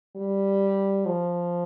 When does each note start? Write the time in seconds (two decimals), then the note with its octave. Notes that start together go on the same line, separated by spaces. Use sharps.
0.16 G3
1.06 F3